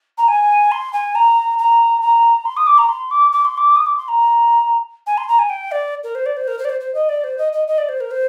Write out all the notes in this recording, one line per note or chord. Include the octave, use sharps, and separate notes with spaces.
A#5
G#5
C6
G#5
A#5
A#5
A#5
C6
D#6
D6
A#5
C6
D6
D6
C6
D6
D#6
D6
C6
A#5
G#5
C6
A#5
G#5
G5
D5
A#4
C5
D5
C5
A#4
C5
D5
C5
C5
D#5
D5
C5
D#5
D#5
D#5
D5
C5
A#4
C5